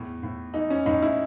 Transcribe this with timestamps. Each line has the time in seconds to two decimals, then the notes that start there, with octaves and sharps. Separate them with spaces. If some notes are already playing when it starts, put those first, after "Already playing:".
Already playing: E2 A2
0.23 A2
0.54 E3 D#4
0.70 C#4
0.86 A2 D#4
1.02 E4